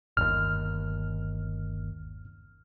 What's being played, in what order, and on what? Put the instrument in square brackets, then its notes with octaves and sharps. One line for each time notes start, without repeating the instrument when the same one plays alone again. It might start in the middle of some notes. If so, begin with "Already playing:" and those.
[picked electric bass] G1 D#2 [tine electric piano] F6